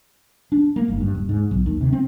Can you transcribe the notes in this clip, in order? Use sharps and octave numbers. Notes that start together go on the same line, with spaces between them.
D4
A#3
G1
G2
D#1
G#2
B1
D#2
C3
C4